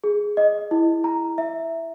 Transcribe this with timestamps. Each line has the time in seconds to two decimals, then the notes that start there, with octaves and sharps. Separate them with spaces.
0.04 G#4
0.37 D#5
0.71 E4
1.04 A#5
1.38 E5